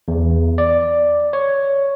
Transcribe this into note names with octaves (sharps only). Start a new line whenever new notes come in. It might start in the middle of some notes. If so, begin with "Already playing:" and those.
E2
D5
C#5